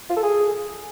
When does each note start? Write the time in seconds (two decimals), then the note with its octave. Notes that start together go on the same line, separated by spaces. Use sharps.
0.10 F4
0.17 A4
0.23 G#4